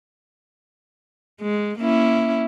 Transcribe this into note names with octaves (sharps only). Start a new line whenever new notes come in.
G#3
A#3 C#4 E4